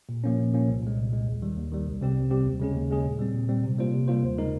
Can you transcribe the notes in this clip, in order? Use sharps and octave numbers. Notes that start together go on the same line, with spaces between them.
A#2
F3 A#3 C#4
A#2
F3 A#3 C#4
C2
A#2 G#3
C2
A#2 G#3
D#2
D#3 G3
D#2
D#3 G3
C2
C3 G3 C4 G4
C2
C3 G3 C4 G4
D#2
C#3 G#3 C#4 G#4
D#2
C#3 G#3 C#4 G#4
A#2
G3 C4
A#2
G3 C4
C3
G3 A#3 F4 C5
C3
G3 A#3 F4 C5
D#2
C#3 G#3 D#4 A#4